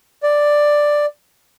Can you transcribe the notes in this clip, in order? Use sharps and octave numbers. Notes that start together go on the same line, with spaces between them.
D5